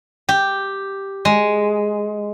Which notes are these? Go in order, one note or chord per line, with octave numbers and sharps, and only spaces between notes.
G4
G#3